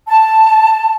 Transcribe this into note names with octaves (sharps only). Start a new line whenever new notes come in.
A5